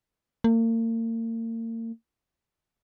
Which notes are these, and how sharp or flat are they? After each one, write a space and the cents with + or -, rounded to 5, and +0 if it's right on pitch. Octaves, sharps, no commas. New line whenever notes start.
A#3 -40